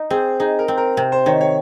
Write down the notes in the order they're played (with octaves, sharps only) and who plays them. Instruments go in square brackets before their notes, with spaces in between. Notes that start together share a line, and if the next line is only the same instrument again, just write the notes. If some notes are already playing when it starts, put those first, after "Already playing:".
Already playing: [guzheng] D#4
[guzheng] C4 [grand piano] G#4
[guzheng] D#4 [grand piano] G#4
[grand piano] A#4
[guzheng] C4
[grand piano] A#4
[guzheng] C3
[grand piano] C5
[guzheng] D#3 [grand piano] C#5
[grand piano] C#5